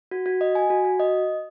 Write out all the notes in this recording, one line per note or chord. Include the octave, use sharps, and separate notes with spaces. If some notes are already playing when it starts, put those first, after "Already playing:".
F#4
F#4
D#5
G#5
F#4
F#4
D#5